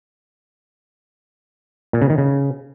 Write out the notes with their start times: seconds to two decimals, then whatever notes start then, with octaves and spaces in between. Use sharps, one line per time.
1.93 A#2
2.02 C#3
2.10 D#3
2.18 C#3